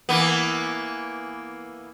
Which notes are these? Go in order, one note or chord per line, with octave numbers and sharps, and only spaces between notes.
E3 A#3 B3